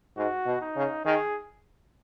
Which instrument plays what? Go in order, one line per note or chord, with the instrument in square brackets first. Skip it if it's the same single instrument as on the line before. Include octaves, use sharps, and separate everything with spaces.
[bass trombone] G#2 [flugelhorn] F#4
[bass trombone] B2
[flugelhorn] D#4
[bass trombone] C#3
[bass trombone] D#3 [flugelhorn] G#4